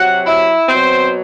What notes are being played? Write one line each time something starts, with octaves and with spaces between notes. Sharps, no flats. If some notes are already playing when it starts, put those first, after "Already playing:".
Already playing: C3 F#3 F#4 F#5
E4 E5
B2 C4 C5
F#3